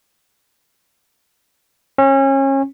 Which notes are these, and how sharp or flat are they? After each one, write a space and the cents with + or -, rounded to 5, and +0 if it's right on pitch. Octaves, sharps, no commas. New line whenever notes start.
C#4 -30